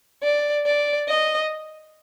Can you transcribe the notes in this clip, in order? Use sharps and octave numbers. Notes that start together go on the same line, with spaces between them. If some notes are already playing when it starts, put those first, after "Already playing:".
D5
D5
D#5